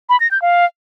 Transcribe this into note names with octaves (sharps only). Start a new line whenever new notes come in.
B5
A#6
G6
F5